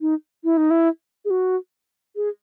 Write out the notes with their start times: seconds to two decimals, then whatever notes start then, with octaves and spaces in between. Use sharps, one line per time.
0.01 D#4
0.44 E4
0.57 D#4
0.70 E4
1.25 G#4
1.30 F#4
2.16 G#4